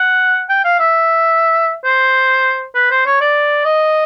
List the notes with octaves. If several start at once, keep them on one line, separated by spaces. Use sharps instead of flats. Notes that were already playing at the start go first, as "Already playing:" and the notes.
Already playing: F#5
G5
F5
E5
C5
B4
C5
C#5
D5
D#5